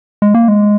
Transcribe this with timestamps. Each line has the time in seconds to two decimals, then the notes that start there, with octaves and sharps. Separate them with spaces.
0.22 G#3
0.34 A#3
0.48 G#3